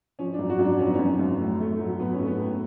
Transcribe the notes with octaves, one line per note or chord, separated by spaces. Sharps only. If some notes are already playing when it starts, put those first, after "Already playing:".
F3 C#4
D4
F#2
F#4
F#2
D4
F3 C#4
B3
C#4
F#2
F#2
A2
A3
F#3
F#3 B3
C#4
A3
B3
A2